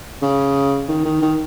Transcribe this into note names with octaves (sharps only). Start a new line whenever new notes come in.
C#3
D#3
D#3
D#3